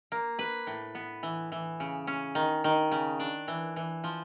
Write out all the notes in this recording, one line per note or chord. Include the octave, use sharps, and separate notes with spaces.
A#3
B4
A2
B3
E3
E3
C#3
C#4
D#3
D#3
C#3
D4
E3
E3
F3